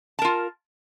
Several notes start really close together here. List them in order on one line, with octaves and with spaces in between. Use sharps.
A5 A#4 F4